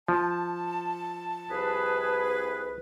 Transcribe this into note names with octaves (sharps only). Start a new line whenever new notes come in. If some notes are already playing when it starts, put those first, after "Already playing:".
F3 A5
C2 G#4 B4